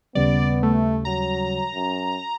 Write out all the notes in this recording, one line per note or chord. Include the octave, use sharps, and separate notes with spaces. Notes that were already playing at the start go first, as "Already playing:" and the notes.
D#2 C#3 G3 B3 D5
A3
F#3 A#5
F#2